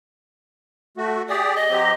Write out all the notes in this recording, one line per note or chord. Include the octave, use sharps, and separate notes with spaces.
A3 F#4
G4 G#4 D5 D#6
D#5
F#3 C4 G4